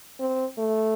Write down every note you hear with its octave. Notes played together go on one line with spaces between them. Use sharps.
C4
A3